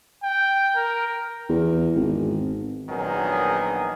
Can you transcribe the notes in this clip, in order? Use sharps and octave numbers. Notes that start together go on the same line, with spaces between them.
G5
A#4
E2
G#1
A#1 D#3 F#3 B3 G#4